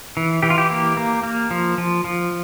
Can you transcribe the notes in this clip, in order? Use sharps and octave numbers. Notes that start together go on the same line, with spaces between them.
E3
E3 G4
F4
G4
A#3
A#3
A#3
F3
F3
F3